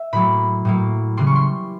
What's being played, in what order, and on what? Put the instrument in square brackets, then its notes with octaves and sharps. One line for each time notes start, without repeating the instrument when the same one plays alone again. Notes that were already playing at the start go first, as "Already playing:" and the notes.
Already playing: [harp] E5
A2 F#3 A#3 B5
A2 F#3 A#3
C#3 E3 G3 C6
C#6
C6